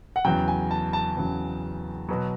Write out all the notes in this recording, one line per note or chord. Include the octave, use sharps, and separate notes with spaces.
F#5
E2 C#3 F#3 G5
G#5
A5
A5
E2 C#3 F#3
B2 F#3